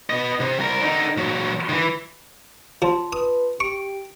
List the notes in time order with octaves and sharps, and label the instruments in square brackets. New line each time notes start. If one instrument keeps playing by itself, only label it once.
[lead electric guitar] B3 D#5
C3
C2 A#4
D3 D#4
A#2 F#3
D#3 E3
[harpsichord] F3 [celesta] F4 A5 C6
[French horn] B4 [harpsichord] D#6
[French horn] G4 [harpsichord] C#6 [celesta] D7